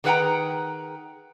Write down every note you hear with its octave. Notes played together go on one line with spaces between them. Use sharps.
D#3 G#4 B4 F#5 G5 A#5